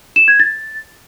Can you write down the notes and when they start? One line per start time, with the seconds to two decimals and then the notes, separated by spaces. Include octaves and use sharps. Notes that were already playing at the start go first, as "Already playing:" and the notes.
0.16 E7
0.28 G#6
0.40 A6